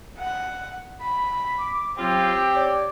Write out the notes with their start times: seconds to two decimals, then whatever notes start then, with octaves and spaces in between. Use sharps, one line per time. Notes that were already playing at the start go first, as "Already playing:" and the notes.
0.18 F#5
1.02 B5
1.58 D6
1.98 F#3 C4 F4 G4
2.55 C#5 D5